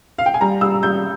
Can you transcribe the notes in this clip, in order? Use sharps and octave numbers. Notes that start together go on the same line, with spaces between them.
F5
G5
G#5
G3 A#5
G3 E6
G3 G6